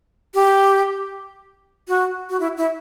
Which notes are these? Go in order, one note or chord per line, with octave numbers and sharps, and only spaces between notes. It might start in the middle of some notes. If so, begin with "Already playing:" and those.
G4
F#4
F#4
E4
E4